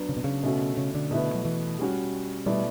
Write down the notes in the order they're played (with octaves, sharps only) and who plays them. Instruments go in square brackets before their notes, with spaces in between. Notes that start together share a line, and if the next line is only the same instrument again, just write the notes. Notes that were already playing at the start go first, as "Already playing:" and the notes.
Already playing: [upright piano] F#3 B3 D4
[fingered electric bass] C#3
B2
C#3
[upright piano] B2 A3 C#4 F#4 A4
[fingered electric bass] C#3
D3
[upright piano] B2 A3 E4 B4
[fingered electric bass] F#3
E3
[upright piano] G3 C#4 F#4
[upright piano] B2 A3 E4 B4 D5 [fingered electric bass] G3